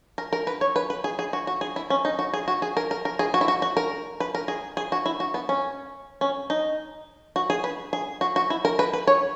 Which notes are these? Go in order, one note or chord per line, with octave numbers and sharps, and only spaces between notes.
A#4
A#4
B4
C#5
B4
B4
G#4
G#4
F#4
F#4
G#4
E4
C#4
D#4
F#4
G#4
F#4
G#4
A#4
A#4
A#4
G#4
F#4
E4
F#4
F#4
A#4
B4
A#4
G#4
G#4
F#4
E4
F#4
B3
C#4
C#4
D#4
F#4
G#4
B4
G#4
F#4
F#4
E4
A#4
B4
B4
C#5